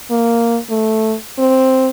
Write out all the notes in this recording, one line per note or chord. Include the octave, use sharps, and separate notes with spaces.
A#3
A3
C4